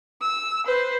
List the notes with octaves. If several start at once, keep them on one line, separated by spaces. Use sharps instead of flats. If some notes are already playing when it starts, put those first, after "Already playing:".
E6
B4 C5